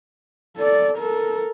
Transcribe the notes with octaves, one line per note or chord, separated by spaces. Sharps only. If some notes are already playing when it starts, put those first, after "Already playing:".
A4 D5
A4 A#4